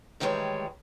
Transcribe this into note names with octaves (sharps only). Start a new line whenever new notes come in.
A2 D#3 E3 G3 G#3 C#5